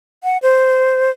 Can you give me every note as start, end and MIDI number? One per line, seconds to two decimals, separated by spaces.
0.24 0.37 78
0.42 1.10 72